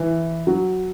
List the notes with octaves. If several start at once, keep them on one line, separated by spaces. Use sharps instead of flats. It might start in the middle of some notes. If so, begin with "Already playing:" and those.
Already playing: E3
F#3